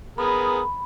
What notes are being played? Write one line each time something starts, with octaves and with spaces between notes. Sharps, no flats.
B3 G#4 A#4 B5